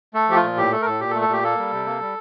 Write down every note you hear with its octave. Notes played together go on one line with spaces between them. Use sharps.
A3 A4
F3 G4
F4
A#2
A2 G4
A3 A4
A#4
A2 A4
A#2 G4
A4
A3
A4
A#2 G4
A#3 A4
G3
C3
A#3
G3